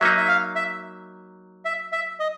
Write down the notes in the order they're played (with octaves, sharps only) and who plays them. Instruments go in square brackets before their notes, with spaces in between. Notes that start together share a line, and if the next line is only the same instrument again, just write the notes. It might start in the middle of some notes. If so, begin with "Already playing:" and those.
[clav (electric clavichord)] F#3 A#3 D#4 [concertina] E5
[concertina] E5
F5
E5
E5
E5
D#5